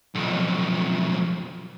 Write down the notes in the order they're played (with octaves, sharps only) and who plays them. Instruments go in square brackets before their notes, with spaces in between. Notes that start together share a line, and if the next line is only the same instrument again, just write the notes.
[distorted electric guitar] B1 F2